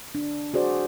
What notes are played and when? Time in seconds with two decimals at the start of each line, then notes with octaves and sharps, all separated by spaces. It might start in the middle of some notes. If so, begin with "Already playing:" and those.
0.15 D4
0.54 F#4 G#4 C5 D5